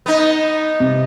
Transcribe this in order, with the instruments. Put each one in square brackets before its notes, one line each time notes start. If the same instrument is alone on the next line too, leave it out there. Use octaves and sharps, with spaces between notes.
[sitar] B3 D#4
[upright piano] C3